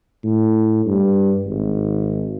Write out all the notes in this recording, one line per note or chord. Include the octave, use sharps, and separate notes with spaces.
A2
G2
G#1